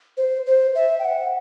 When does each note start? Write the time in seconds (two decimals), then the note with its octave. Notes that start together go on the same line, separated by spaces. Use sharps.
0.17 C5
0.46 C5
0.75 E5
0.99 G5
1.05 F#5